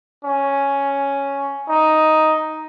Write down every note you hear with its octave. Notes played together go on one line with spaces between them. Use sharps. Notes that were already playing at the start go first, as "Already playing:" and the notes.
C#4
D#4